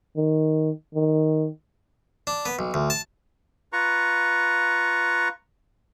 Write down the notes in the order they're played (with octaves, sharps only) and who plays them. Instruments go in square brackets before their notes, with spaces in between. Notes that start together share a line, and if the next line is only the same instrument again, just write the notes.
[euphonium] D#3
D#3
[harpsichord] D4
B3
B1
D2
A5
[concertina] F4 B4 A#5 C#6